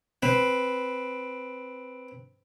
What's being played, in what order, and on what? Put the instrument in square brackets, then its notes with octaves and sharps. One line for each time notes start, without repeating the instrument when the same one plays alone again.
[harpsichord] C4 B4